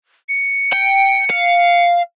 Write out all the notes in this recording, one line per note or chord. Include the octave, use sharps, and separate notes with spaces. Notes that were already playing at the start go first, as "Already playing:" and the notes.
C#7
G5
F5